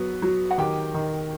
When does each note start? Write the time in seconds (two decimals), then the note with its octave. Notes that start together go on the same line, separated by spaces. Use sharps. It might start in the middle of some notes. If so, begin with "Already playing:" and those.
Already playing: F#3 B3
0.22 F#3
0.51 F#5
0.58 D#3 G4 G5
0.94 D#3